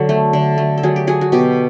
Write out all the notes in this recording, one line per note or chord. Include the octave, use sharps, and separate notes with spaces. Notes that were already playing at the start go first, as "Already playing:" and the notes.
Already playing: D3 F#3
A3
D3
A3
A4
F#3 G#4
G4
F#3 G#4
F#4
B2 G4